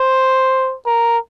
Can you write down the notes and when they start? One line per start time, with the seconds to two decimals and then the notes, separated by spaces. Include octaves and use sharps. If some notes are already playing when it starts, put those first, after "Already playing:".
Already playing: C5
0.86 A#4